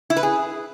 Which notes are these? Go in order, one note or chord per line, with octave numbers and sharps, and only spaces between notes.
E4
B4
G#4